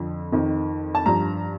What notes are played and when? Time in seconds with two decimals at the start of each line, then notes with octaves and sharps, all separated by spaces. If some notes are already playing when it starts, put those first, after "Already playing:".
Already playing: F2 D3 F3
0.32 F2 D#3
0.95 A5
1.06 G2 F3 A#5